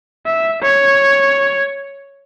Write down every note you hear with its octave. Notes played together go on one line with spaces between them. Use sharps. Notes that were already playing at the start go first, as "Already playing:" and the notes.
E5
C#5